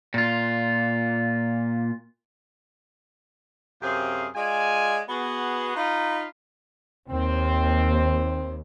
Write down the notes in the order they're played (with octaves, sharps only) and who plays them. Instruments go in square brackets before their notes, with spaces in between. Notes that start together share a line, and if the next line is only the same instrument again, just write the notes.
[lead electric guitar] A#2 F4
[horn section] F#2 C3 C4 G4 G#4 F5
G#3 F4 D5 G#5
B3 F#4 G#4
D#4 F4 B5
[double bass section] D#2 [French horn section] C4